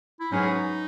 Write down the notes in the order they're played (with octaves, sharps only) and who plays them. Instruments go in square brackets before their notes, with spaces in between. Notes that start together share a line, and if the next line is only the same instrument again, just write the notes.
[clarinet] E4
[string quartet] G#2 F#3 C#4 G#4 B4 [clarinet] D#4